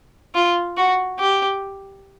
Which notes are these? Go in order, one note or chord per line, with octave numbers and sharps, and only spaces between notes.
F4
F#4
G4